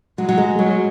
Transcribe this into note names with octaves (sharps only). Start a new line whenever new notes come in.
F#3 G#3
F#3
G#3
F#3 G#3